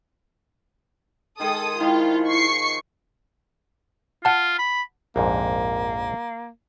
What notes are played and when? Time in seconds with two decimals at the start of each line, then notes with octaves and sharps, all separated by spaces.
1.40 D#3 G#3 G#4 A4 D#6
1.80 D#3 F3 G#3 E4 F4
2.29 C#6 C7 C#7
4.25 F4 F#5 A5
4.59 B5
5.16 A#1 F2 G#2 A#3